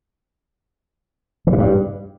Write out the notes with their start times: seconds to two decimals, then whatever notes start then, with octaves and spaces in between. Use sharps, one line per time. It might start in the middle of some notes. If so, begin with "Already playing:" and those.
1.47 E3
1.53 C3
1.58 G2